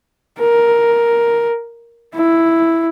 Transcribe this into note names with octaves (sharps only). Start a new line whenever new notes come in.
A#4
E4